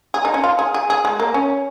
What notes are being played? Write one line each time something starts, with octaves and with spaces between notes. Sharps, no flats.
G#4
D#4
C#4
F4
G#4
G#4
G#4
G#3
A#3
C#4